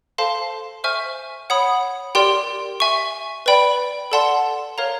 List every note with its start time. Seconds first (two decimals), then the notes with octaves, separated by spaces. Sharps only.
0.18 A4 C5 F5 A5 C6
0.84 C5 E5 G#5 C#6 F6
1.50 C#5 F#5 B5 D#6
2.15 G4 A#4 D5 G5 C6
2.80 E5 G#5 C#6
3.46 B4 D5 G5 B5
4.12 A4 D5 F#5 A5 C6
4.78 A#4 C#5 F5 A#5